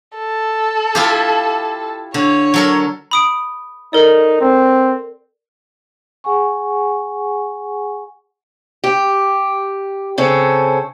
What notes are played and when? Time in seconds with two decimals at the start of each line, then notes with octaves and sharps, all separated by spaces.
0.18 A4
0.95 E4 F4 G4
2.14 D3 C#5
2.54 F#3 A4 A#4
3.11 B5 D#6 D7
3.93 D#4 A4 A#4 D5
4.41 C4
6.24 G#4 F#5 G#5 C#6
8.84 G4
10.18 C#3 C4 C#4 A4